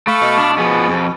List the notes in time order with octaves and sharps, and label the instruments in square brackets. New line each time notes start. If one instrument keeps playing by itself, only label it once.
[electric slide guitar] A3 [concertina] F5 B5 C#6
[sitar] B2
[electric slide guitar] D4
[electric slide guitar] F3 B3 [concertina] G#4
[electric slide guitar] F2